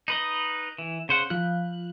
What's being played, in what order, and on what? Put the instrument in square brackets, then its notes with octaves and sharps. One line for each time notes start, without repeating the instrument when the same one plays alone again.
[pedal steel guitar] D#4 B4 D#5
E3
C#3 C5 F#5
[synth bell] F3 F4 [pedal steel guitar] F#6